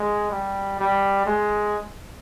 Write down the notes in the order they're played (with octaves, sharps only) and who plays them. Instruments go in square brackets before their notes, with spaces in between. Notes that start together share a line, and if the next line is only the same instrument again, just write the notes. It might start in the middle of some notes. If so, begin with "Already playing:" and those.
Already playing: [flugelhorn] G#3
G3
G3
G#3